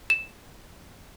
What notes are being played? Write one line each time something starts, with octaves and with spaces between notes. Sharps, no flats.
E7